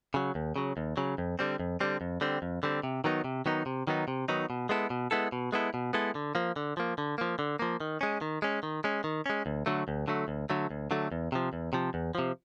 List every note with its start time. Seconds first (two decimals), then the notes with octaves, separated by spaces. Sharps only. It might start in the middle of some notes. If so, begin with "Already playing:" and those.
0.14 C#3 F#3
0.35 D#2
0.56 C#3 F#3
0.77 D#2
0.97 C#3 F#3
1.18 F2
1.39 D3 G3 C4
1.59 F2
1.80 D3 G3 C4
2.01 F2
2.21 D3 G3 C4
2.42 F2
2.63 D3 G3 C4
2.83 C3
3.04 D#3 F#3 B3 D#4
3.24 C3
3.46 D#3 F#3 B3 D#4
3.66 C3
3.87 D#3 F#3 B3 D#4
4.08 C3
4.28 D#3 F#3 B3 D#4
4.50 B2
4.69 G#3 B3 E4 A4
4.90 B2
5.11 G#3 B3 E4 A4
5.32 B2
5.52 G#3 B3 E4 A4
5.74 B2
5.93 G#3 B3 E4 A4
6.15 D3
6.35 F3 A#3
6.56 D3
6.77 F3 A#3
6.98 D3
7.18 F3 A#3
7.39 D3
7.59 F3 A#3
7.80 D#3
8.01 G#3 C#4
8.21 D#3
8.42 G#3 C#4
8.63 D#3
8.84 G#3 C#4
9.04 D#3
9.26 G#3 C#4
9.46 D2
9.66 D3 F#3 A3
9.88 D2
10.08 D3 F#3 A3
10.28 D2
10.50 D3 F#3 A3
10.70 D2
10.91 D3 F#3 A3
11.12 E2
11.32 C3 F3
11.53 E2
11.73 C3 F3
11.94 E2
12.15 C3 F3